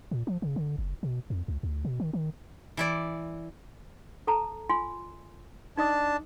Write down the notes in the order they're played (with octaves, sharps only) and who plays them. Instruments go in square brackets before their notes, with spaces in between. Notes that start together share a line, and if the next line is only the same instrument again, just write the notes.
[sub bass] A#2
F3
C#3
D3
F#1
B2
F2
C#2
D2
B2
D#3
D#3
[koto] E3 E4 D5
[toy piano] A4 A5 A#5
F4 G#5 C6
[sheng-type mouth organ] D4 A5 [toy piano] D#4 D#5 D#6